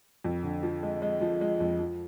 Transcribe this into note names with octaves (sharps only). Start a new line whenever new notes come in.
F2
D3
F3
G#3
G#3
F3
G#3
F2
F3